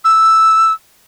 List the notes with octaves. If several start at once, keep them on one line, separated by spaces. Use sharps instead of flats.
E6